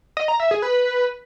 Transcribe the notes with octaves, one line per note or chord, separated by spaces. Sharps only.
D#5
A#5
E5
G#4
B4